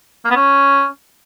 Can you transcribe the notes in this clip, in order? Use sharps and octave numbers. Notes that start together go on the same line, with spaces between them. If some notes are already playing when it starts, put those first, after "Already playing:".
A#3
B3
C#4